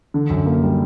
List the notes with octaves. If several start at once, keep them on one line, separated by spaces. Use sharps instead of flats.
D3
F#2
A#3
G3